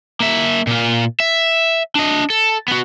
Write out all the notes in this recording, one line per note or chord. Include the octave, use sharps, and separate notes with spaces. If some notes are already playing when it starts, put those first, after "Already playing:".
A#3 E5
A#2 F4
E5
D4 D#5
A4
B3 F#4